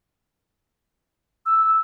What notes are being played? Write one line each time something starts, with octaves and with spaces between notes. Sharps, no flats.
E6